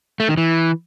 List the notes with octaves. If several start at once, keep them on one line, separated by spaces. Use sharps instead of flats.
A3
D#3
E3